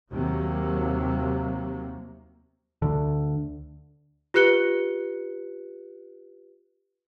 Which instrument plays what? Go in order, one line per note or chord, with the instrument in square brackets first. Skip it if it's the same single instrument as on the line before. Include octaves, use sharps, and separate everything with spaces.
[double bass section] D#2 C3 F#3 A#3
[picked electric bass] D2 D3
[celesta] F4 G4 B4 F#6 C#7 G7